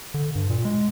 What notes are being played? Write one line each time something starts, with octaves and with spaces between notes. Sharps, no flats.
D3
G2
A#2
G#3